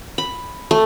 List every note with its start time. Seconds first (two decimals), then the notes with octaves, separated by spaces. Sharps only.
0.18 B5
0.71 A3